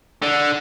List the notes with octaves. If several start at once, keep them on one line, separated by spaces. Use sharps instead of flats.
D3